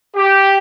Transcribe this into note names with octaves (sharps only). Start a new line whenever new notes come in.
G4